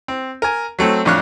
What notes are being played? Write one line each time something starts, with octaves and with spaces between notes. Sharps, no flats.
C4
A#4 G#5
F#3 A3 C4
A1 F2 D4 C#5 F5 F#6